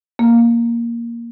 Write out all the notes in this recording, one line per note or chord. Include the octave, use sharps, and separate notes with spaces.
A#3